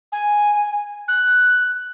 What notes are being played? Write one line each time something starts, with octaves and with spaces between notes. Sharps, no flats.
G#5
F#6